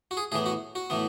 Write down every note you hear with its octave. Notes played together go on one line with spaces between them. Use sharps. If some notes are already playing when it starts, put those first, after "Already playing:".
F#4
G#4
A2 E3 B3 G#4
F#4
F#4
A2 E3 B3